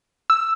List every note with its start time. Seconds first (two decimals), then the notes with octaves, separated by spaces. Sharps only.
0.30 E6